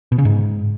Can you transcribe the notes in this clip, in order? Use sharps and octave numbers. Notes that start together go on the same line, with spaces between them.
B2
C#3
G#2